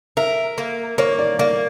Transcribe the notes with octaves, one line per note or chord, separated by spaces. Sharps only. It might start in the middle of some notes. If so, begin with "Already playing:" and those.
A#4 E5
A#3
A#3 C#5
D5
A#3 D5